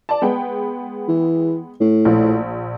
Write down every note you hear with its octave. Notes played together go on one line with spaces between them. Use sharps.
D5 A5
G#3 B3 G5
E3
A2
A#1